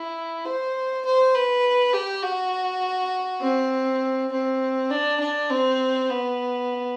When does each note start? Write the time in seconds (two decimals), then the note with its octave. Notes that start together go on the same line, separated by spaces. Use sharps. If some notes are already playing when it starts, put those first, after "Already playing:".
Already playing: E4
0.45 C5
1.05 C5
1.35 B4
1.93 G4
2.23 F#4
3.42 C4
4.31 C4
4.91 D4
5.20 D4
5.50 C4
6.10 B3